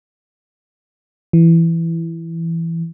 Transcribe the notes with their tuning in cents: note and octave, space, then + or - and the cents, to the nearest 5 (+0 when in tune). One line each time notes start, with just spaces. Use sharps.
E3 +10